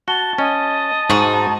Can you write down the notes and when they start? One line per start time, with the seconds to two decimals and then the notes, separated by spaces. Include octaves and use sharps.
0.08 F#4 A5 G7
0.38 C#4 D#5
1.10 G#2 D#4 F#4